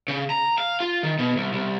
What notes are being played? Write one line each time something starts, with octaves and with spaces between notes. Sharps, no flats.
C#3
A#5
F5
F4
D#3
B2
C2
C2